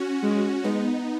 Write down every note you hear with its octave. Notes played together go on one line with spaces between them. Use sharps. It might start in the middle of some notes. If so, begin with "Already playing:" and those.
Already playing: C#4 F#4
G#3
G#3 B3 D#4